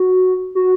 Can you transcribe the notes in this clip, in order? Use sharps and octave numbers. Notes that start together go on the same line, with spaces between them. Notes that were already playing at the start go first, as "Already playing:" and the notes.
Already playing: F#4
F#4